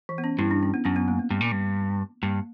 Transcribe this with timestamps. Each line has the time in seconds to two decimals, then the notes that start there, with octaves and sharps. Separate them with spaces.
0.09 E3
0.18 B3
0.24 C#4
0.39 G2 E4
0.51 D4
0.63 C#4
0.74 B3
0.85 F#2 C#4
0.96 B3
1.08 A#3
1.19 B3
1.30 G2
1.41 A#2
1.52 G2
2.22 G2 A#3